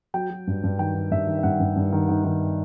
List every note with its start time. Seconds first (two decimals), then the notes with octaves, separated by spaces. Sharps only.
0.14 F#3 G5
0.30 F#3
0.47 G2
0.64 G2
0.79 D#3 G5
0.95 D#3
1.11 G2 E5
1.27 D#3
1.39 E5
1.43 G2 F#5
1.60 G2
1.76 G2
1.92 D#3
2.09 D#3
2.24 D#3